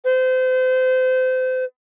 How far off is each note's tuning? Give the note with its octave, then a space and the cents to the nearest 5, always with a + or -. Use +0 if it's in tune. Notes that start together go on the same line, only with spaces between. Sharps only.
C5 -30